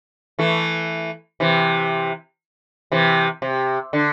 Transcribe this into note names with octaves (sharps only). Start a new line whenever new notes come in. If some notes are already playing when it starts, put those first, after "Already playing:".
E3 A3
C3 E3
C3 E3
C3
D3